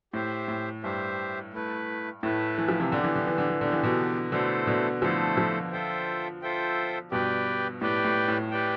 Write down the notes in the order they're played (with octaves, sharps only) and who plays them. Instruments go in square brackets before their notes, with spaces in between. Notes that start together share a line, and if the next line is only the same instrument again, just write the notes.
[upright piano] A2 [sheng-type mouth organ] G4 C5 E5
[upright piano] A2
[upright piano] G2 [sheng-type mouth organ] G4 C5 E5
[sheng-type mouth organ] A3 E4 B4
[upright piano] A2 [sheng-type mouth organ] A3 E4 B4
[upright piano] E3
F3
C3 E3
[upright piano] D3 [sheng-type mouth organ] B3 D4 G4
[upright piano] E3
D3
E3
D3
E3
[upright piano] D3 [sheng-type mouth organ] B3 D4 G4
[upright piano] E3
B2 D3
[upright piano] B2 D3 [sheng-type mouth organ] A3 E4 A4 C5
[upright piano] B2 D3
[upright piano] D3 F3 [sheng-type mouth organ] A3 E4 A4 C5
[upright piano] D3 F3
[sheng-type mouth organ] F4 A4 C5 E5 G5
F4 A4 C5 E5 G5
[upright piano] G2 B2 [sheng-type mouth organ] G4 B4 D5 G5
[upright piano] A2 [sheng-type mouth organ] G4 B4 D5 G5
[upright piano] A2
A2
[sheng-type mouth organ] G4 B4 D5 G5